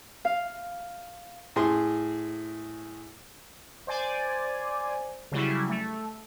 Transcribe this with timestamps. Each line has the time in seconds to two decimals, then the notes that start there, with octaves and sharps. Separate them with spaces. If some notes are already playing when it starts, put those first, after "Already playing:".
0.25 F5
1.56 A2 G#4 C6
3.87 C5 D5 G#5
5.32 C#3 F#3 G3 E4
5.69 A3